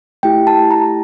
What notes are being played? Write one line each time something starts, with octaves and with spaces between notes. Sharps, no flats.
A3 E4 G4 G5
A5
A#5